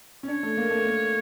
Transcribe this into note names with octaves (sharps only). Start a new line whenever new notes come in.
C#4
D4 C#5
A3
A#3
A3
A#3